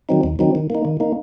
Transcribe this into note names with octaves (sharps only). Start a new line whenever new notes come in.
D#3 F#3 C4 D#4
D#2
D#3 F#3 C4 D#4
D#3
A#3 D#4
D#3
A#3 D#4